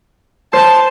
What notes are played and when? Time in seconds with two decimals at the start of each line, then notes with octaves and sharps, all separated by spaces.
0.53 C5 A5